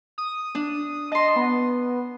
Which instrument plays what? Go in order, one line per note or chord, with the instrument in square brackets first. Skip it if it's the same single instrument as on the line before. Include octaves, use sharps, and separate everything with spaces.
[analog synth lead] D#6
[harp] D4
[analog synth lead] D#5 [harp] A5 C6
[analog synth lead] B3